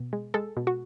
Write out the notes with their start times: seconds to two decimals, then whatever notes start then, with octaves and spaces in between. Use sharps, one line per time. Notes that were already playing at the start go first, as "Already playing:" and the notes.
Already playing: B2
0.13 G#3
0.34 G#3 A4
0.57 B2
0.67 F#4